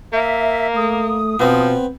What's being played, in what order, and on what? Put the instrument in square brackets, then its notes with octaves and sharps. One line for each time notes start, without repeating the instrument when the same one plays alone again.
[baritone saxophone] A#3 [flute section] E5
[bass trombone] A3 [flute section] D#6
[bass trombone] B2 [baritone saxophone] F3 [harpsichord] B3 C4